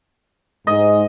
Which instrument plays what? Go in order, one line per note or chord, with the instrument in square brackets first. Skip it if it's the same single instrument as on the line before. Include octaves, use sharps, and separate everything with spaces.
[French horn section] G#2 [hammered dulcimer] D#5